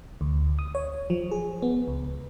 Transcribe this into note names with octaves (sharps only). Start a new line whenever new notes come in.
D2
D#6
C#5
F3
G#4
B3
C#2